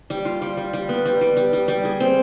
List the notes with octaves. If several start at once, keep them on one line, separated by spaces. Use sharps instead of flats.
G3
F4
G3
G3
G3
B3
G3
G3
G3
G3
G3
G#4
C4